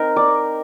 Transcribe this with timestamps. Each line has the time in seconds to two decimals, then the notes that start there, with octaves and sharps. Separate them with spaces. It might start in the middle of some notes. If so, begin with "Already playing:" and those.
Already playing: C4 D#4 A#4
0.16 D5